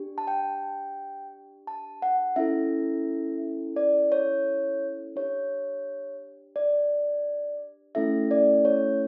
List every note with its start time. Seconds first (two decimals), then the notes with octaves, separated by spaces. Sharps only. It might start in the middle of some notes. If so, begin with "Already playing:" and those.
Already playing: D4 G4
0.18 A5
0.27 G5
1.67 A5
2.02 F#5
2.36 C#4 E4 A4 E5
3.76 D5
4.12 C#5
5.16 D4 G4 C#5
6.56 D5
7.95 A3 C#4 E4 A4 E5
8.31 D5
8.65 C#5